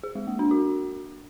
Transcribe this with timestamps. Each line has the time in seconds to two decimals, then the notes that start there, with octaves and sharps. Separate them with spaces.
0.03 G#4
0.15 G#3
0.27 A#3
0.39 D4
0.51 F#4